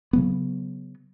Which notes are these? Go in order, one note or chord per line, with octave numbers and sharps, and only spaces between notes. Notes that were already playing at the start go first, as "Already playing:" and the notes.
C#3 F#3 B3